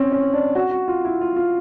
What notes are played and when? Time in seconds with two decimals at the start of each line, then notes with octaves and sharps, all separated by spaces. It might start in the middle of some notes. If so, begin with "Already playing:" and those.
Already playing: C4 C#4
0.12 C#4
0.33 D4
0.55 F#4
0.71 F#4
0.88 F4
1.04 E4
1.21 F4
1.36 F4